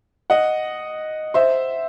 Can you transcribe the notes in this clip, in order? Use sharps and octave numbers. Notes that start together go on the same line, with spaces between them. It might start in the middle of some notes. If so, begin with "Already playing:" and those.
D#5 F#5
C5 E5